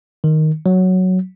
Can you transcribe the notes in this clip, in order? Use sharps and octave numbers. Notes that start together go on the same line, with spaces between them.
D#3
F#3